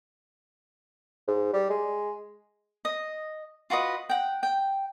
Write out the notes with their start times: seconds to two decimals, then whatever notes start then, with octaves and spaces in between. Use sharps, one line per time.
1.28 G#2
1.53 G3
1.70 G#3
2.85 D#5
3.70 F4 F#4 B4 D#5
4.09 F#5 G5
4.43 G5